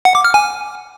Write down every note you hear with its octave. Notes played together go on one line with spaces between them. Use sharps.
F#5
D6
F6
G#5